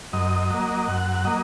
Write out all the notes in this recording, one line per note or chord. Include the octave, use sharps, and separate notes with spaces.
F#2 D#5
F#3 A#3
F#2 F#5
F#3 A#3 D#5